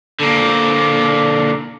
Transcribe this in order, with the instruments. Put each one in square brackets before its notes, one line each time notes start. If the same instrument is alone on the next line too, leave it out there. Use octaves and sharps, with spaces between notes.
[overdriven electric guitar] D3 A#3